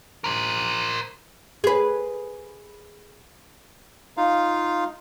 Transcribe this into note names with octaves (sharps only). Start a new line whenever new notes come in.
A#4 C5
G#4 B4
D#4 F4 F5